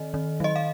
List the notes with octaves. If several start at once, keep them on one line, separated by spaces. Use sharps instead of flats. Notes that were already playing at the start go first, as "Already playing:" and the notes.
Already playing: D#3 D#5
D#3
F#3 D#5
F5